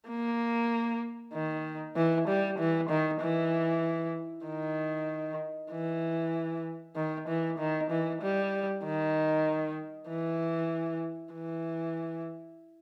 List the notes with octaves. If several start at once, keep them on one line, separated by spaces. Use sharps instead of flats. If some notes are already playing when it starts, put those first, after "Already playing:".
A#3
D#3
E3
G3
E3
D#3
E3
D#3
E3
D#3
E3
D#3
E3
G3
D#3
E3
E3